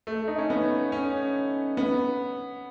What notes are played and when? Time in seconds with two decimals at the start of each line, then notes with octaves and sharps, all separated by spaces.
0.07 A3
0.28 D#4
0.38 C#4
0.50 B3
0.92 C#4
1.77 B3